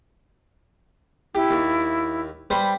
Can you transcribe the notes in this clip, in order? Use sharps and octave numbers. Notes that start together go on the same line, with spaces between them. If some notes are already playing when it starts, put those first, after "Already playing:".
E4 G4
D#2
G3 B4 C5